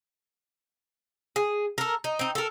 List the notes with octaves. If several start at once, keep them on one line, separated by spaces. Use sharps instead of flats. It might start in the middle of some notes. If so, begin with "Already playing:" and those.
G#4
A4 A#4
D#4
C4 D#4
A4 A#4